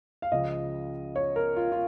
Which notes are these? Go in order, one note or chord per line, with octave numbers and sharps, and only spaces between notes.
F5
C#2 C#3 F3 D#5
C#5
A#4
F4
F4